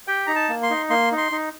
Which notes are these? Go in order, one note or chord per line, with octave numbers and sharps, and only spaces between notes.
G4 G5
D#4 A#5
A5
A#3
C6
D#4
A#3 C6
D#4
C6
D#4